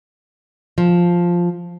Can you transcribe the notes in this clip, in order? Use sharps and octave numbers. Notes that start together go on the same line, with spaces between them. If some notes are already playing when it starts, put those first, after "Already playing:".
F3